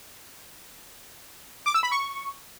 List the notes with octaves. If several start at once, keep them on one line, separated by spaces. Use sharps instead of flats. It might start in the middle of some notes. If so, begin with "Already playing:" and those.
D6
E6
B5
C#6